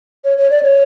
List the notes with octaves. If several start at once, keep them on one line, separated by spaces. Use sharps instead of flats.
C#5
C#5
D5
C#5